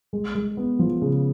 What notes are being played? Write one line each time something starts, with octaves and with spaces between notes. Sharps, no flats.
G#3
G#3
B3
F3
C#3